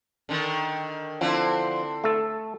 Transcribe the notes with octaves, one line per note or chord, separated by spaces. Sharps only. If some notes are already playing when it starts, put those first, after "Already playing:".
D3 D#3
D3 F3 C4 E4
A3 A4